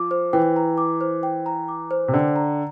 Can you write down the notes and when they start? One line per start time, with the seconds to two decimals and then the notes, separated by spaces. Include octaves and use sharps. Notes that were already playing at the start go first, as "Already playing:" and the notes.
Already playing: F3 D6
0.11 C5
0.33 E3 G5
0.56 A#5
0.78 D6
1.01 C5
1.23 G5
1.46 A#5
1.68 D6
1.91 C5
2.08 C3
2.13 D3 G5
2.36 A#5